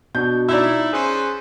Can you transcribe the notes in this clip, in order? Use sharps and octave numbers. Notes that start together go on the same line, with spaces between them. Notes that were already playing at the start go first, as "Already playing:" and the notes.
B2 D4 F#4 G6
D#4 E4 D5 A#5 E6
C#4 G#4 B4 C5